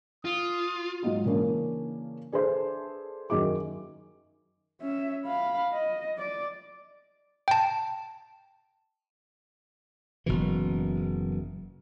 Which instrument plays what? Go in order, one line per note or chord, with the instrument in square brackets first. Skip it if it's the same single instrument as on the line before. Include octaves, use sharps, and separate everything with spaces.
[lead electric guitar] F4 [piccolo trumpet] D#6
[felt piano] G#2 F#3 G#3 F4 F#4
C#3 E3 A#3 C#4 D4
D4 G#4 A4 B4 C5 E5
F#2 D#3 G#4 E5 D6
[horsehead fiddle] C#4 E5
F5 B5
D#5
D5
[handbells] G5 A5
[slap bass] F#1 B2 E3